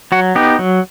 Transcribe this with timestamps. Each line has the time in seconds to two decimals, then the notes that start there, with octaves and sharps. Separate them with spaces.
0.12 F#3 F#4
0.35 B3 D#4 G4
0.59 F#3